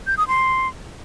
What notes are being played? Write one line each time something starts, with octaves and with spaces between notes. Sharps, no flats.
G6
D#6
C6